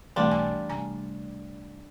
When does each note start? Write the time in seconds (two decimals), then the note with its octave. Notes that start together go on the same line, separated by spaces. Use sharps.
0.16 B1 E3 G3 A3 C4 D4 F4
0.32 G#5
0.69 C2 A3 G#5 A#5